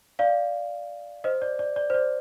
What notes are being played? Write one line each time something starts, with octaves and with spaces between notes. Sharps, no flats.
D5 F5
C5 D#5
D5
D5
D5
C5
D5